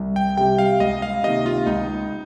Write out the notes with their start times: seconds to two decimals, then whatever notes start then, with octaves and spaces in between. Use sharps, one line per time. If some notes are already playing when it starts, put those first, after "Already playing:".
Already playing: C2
0.16 G5
0.37 C3 G3 G5
0.58 F5
0.80 C#2 D#5
1.02 F5
1.23 C3 D#3 A#3 D#5
1.46 F4
1.66 C#2 D#4